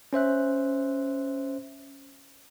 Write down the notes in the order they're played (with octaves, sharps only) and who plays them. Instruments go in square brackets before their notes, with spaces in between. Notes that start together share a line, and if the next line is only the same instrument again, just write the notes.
[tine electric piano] C#4 C5 E5 F#6